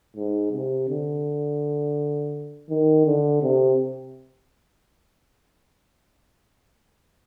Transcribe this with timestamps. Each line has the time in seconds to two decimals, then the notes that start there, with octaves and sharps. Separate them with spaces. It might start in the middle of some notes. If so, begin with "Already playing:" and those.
0.16 G#2
0.53 C3
0.89 D3
2.70 D#3
3.06 D3
3.42 C3